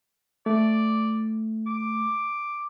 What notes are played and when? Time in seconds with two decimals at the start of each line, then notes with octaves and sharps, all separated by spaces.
0.46 A3 D5
1.67 D6